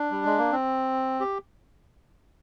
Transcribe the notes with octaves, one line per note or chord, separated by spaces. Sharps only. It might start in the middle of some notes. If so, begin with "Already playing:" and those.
Already playing: D4
G3
G#3
A#3
C4
G4